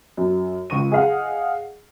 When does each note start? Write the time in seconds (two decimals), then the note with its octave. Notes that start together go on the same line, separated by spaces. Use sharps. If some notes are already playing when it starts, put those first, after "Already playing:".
0.17 F#2
0.70 C#2 C#6 D#7
0.92 G#4 D#5 F5 F#5